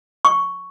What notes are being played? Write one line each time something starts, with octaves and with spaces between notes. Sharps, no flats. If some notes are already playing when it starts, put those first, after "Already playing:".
C#6